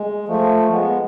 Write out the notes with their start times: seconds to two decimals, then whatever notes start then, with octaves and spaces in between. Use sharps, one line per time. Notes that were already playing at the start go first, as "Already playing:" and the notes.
Already playing: G#3
0.28 F3 A3
0.72 G#3 B3